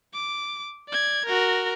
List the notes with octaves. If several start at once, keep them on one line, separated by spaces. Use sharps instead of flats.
D6
D5 G#6
F#4 A#4